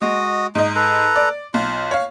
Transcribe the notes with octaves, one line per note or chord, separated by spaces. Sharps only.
G#3 F#4 D#5 D#6
G#2 D#4 D#5
A4 B4 A#5
D5
B1 F4
C#5 F5